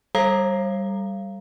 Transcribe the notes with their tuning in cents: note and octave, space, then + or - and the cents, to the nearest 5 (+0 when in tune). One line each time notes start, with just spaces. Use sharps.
G3 +0 A4 +0 F5 -25